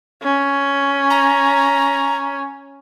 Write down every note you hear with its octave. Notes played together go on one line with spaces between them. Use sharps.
C#4
A#5